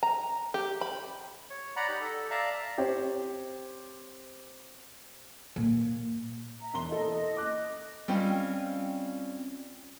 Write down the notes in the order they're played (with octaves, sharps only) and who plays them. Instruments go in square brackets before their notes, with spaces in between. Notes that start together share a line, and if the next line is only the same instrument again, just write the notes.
[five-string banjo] A#5
G4
B5
[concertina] C#5
D5 F#5 A#5 B5
D#4 G4
A4
D5 E5 F5 A5 A#5
[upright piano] C4 G4 C5 C#5
[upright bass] A#2
[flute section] E5 A#5
[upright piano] E1 C6 G7
[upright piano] E4 A4 [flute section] D#5
[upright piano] D6 F#6
[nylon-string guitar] G3 C4 C#4 F4 D#5